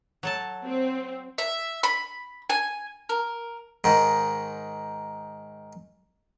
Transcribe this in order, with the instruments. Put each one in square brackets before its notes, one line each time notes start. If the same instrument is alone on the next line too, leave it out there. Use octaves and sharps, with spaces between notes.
[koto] F#3 A4 A5
[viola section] C4
[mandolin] E5
B5
G#5
A#4
[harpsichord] G#2 D#3